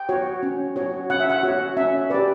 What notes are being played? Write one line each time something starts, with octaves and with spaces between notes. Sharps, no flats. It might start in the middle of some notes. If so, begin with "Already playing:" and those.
Already playing: G5
F#4 C#5
C#4
F#4 C#5
C#4 F#5
E5
F#5
F#4 C#5
C#4 E5
G4 B4 D5